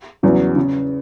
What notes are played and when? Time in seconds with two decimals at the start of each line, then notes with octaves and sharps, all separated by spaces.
0.23 E2 C#3 F#3
0.56 C#3